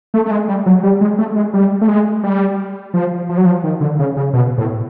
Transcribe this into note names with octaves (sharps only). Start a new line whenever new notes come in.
A3
A3
G#3
G3
F#3
G3
G#3
A3
G#3
G3
A3
G#3
G3
F3
F3
F#3
F3
D#3
D3
C#3
C#3
B2
A2